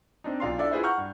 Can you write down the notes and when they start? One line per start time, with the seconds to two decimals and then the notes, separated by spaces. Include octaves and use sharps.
0.24 C4 D4 D#4
0.40 B1 F4 D5 F5 A#5 C6
0.58 D4 E4 A4 D5 E5
0.71 E4 F4 G#4 B4 C5 E5
0.83 F#5 A#5 C#6 F6 G6
0.98 G2